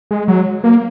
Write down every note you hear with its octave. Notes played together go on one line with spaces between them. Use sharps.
G#3
F#3
A#3